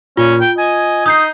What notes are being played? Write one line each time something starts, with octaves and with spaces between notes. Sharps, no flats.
A#2 C#4 F4
G5
D#5 G#5
D#4 D#6 G6 C7